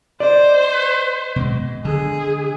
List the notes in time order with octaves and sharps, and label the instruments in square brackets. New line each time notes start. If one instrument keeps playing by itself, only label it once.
[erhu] C5 [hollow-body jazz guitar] D5 [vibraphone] D#5
[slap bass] B2 G#3
[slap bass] D3 [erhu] G#4